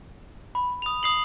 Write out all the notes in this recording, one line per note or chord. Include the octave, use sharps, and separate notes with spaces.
B5
D#6 F7
D#6 C7 F#7